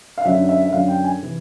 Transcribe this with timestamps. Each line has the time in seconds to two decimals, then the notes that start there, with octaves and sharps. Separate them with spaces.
0.18 F5
0.25 F#2 D3 E5
0.49 E5
0.65 E5
0.72 F#2 D3 F5
0.88 G5
1.04 G#5
1.22 C3 E3